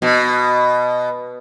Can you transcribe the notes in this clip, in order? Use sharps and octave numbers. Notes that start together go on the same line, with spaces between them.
B2